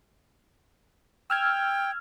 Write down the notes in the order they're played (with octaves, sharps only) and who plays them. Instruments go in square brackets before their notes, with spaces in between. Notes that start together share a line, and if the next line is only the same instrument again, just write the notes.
[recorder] G5 [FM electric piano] E6 F6 G#6